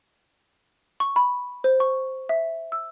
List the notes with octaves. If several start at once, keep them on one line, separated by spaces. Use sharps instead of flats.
C#6
B5
C5
C#6
E5
E6